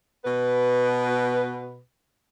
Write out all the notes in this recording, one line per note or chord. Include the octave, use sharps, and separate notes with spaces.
B2 B4